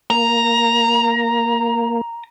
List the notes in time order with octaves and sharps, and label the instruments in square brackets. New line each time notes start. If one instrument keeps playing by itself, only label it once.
[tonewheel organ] A#3 [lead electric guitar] A#5